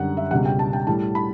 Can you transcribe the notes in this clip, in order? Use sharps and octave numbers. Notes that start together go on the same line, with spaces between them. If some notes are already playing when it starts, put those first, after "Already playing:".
Already playing: F#2 D3 G3 F#5
E5
C#2 B2 G3 F#5
G5
A5
G5
A2 G3 A5
B5